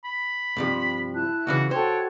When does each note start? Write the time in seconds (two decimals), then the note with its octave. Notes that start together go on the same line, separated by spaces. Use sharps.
0.05 B5
0.57 G2 C3 F3
1.14 E4 A5 F#6
1.47 C#2 C#3 E3 F#4
1.71 F#4 A4 C5 C#5 G5